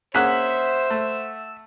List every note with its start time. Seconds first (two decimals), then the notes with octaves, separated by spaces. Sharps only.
0.15 A#3 C#4 G#4 C5 E5 F#5 F#6 B6
0.90 A3